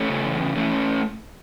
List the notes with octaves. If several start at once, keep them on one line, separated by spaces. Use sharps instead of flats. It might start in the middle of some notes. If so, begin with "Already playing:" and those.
Already playing: A3 C#4
C#3
E2
C#3
E3 A3 C#4